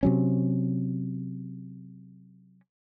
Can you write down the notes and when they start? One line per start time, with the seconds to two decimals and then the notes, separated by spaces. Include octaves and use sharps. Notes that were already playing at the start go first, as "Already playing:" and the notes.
0.03 C3 F#3 C#4